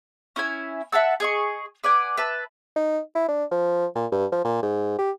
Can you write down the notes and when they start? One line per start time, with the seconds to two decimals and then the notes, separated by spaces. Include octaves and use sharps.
0.36 C#4 E4 E5 G#5
0.92 E5 F#5 A5 E6
1.20 G#4 D#5 C#6
1.83 B4 D5 F#5 G#5
2.17 B4 E5 A5
2.76 D#4
3.15 E4
3.29 D4
3.51 F3
3.96 A#2
4.12 G2
4.32 F3
4.45 A#2
4.63 G#2
4.98 G4